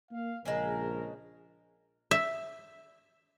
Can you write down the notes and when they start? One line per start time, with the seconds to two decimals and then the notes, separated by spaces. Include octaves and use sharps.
0.12 A#3 F5
0.45 A#1 C#3 F3 G#3 A#4
2.11 E5